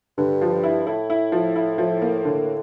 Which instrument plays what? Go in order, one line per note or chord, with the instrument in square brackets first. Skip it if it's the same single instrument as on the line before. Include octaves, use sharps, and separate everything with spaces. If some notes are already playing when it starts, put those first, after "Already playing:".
[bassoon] G2 [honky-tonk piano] D3
[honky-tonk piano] F3
E4
[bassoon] A2 [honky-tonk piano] E4
[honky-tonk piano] E4
F3
E4
F3
A#3
D3